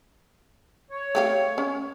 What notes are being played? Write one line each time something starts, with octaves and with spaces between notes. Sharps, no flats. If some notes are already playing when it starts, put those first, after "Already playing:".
C#5
A3 G4 F5
C#4